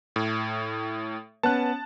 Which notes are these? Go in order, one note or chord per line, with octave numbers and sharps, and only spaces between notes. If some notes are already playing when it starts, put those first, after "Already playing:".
A2
B3 C#4 A5 F#6